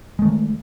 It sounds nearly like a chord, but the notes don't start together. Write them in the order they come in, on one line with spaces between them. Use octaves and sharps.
G#3 A3 D#3